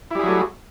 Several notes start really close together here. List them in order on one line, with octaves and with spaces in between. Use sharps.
E4 G3 G#4 F#3 A3